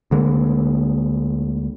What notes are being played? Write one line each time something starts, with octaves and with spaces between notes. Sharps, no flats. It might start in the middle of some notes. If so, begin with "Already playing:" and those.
D2 D3 G#3 A#3